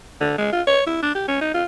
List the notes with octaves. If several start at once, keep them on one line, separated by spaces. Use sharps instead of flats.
D3
G#3
F4
C#5
E4
D4
G4
C#4
D#4
F4